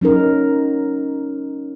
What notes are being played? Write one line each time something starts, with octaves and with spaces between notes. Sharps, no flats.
F#3 C#4 D#4 A#4